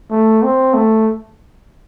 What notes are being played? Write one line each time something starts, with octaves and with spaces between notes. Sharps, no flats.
A3
C4
A3